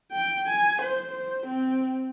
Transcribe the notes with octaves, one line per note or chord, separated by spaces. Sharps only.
G5
G#5
C5
C5
C4